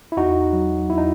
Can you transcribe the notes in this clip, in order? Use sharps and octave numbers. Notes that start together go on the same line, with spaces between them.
E4
E2 D#4 F#4
F#3
E2 E4
D#4